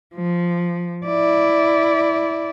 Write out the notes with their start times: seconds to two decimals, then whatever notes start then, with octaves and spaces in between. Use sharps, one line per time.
0.15 F3
1.06 E4 D5